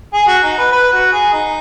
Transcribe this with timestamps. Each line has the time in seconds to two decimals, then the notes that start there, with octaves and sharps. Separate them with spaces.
0.13 G#4
0.27 F#4
0.43 D#4
0.58 B4
0.72 B4
0.93 F#4
1.12 G#4
1.33 D#4